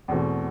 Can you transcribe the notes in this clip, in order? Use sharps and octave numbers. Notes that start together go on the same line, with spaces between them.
E2 B2 A3 C4 F#4